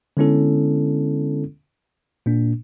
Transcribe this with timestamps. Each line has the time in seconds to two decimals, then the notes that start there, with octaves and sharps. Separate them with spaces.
0.17 D3 G#3 B3 C#4 E4 A4
2.26 A#2 A#3 D4